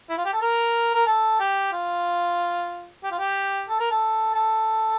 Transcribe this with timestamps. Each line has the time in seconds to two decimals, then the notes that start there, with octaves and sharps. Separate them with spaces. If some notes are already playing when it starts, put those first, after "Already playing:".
0.09 E4
0.17 F4
0.25 G4
0.33 A4
0.41 A#4
0.95 A#4
1.07 A4
1.40 G4
1.72 F4
3.04 G4
3.11 F4
3.19 G4
3.69 A4
3.80 A#4
3.91 A4
4.34 A4